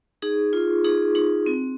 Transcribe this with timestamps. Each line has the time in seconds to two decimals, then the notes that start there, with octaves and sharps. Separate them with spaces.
0.22 D#4 G#4
0.53 F4
0.85 D#4 G#4
1.15 D#4
1.46 C4